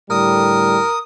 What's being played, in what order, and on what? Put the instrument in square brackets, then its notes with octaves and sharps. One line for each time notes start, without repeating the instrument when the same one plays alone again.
[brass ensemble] A2 D3 G3 [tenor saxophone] A#4 [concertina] D#6